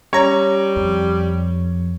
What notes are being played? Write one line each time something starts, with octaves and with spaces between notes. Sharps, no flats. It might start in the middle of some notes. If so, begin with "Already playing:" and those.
G3 C#4 C#5 A#5
F2